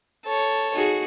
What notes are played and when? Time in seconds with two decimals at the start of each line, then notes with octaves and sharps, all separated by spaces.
0.25 A4 C#5
0.74 D#4 F#4 G#4